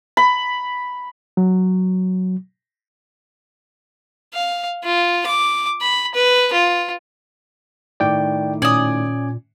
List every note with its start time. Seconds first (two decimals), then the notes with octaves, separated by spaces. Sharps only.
0.17 B5
1.37 F#3
4.34 F5
4.84 F4
5.26 D6
5.82 B5
6.15 B4
6.53 F4
8.00 A2 D#3 D5 G5 D6
8.62 A#2 C#4 D5 G#5 D#6 G#6